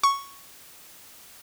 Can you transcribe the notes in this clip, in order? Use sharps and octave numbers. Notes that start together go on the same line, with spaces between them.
C#6